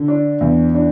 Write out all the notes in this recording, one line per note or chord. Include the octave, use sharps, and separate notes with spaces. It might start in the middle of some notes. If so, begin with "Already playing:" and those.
Already playing: D3
D4
E2
D4